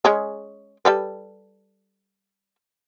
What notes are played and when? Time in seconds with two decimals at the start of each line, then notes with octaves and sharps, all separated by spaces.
0.05 G#3 C#4 G#4
0.85 G3 A4 B4